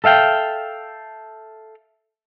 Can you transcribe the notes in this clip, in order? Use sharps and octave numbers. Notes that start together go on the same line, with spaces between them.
A4 E5 F5 G5